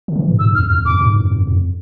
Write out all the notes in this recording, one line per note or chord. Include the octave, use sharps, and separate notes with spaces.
D3
E3
G#2
G#2 E6
E2 F6
E2 F6
F2 D6
G#2
F2
F2
F2